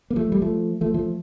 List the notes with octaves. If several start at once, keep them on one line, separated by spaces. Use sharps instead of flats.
A#3
F3 A3
G3
F3 A3
F3 A3
F3 A3